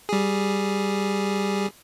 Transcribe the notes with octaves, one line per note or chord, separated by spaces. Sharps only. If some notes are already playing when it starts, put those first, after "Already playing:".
G3 G#4